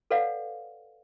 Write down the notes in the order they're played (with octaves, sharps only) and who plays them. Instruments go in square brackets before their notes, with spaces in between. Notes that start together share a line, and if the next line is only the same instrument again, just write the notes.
[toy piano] A4 B4 C#5 D5 F5 F#5